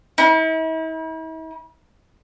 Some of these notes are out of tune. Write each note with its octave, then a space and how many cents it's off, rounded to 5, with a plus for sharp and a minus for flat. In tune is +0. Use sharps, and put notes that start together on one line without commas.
E4 -45